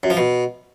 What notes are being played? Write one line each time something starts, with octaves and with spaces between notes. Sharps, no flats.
F#2
F3
B2